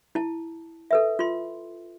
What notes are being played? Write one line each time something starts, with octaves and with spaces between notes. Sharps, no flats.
E4 A5
A4 B4 E5
F4 C6